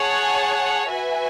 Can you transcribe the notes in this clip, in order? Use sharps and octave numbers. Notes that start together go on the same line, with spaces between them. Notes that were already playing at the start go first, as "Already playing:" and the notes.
Already playing: G#4 C#5 F#5 A5
F#4 B4 E5 G#5